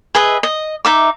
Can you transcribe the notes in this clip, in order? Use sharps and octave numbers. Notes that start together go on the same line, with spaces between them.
G#4 B4 D#5 E5
D#5
D#4 E5 D6